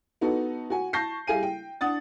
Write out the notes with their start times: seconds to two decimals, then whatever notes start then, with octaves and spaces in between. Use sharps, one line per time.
0.21 B3 D#4 F#4 A4
0.70 F#4 G#5
0.93 A5 C#6 G6 A#6 C7
1.27 G3 E4 G#4 F5 G#5 D#7
1.43 G5
1.81 D4 F#5 D#6 A6